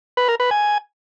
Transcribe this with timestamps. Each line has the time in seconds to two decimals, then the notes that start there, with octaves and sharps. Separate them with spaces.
0.17 B4
0.28 A#4
0.40 B4
0.51 G#5